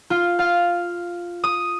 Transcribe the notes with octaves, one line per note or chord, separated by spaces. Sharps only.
F4
F5
D#6